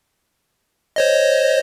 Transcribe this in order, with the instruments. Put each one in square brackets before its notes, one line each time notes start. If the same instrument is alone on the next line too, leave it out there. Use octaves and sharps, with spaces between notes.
[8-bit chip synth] C5 C#5 D#5